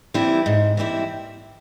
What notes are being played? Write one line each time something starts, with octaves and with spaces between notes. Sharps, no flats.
E3 G3 C4 E4
G#2
E3 G3 C4 E4